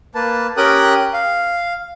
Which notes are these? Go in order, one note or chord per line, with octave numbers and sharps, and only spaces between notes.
A#3 B4 A5
C#4 G4 A#4 G5 D#6 F#6
F5